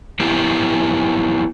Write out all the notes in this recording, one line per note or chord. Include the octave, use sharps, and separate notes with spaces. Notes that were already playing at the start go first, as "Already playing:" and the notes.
B3 E4 G4 A#4